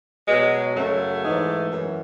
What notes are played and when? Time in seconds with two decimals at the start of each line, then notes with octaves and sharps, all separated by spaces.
0.27 B2 F#3 G#3
0.76 F#2 C#3 F#3 A3
1.23 G#2 E3 G#3
1.70 F#2 E3